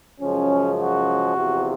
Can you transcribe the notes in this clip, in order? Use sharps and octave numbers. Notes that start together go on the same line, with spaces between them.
F#2 C#3 F3 G#3 C#4
F#4
E2 C3 F3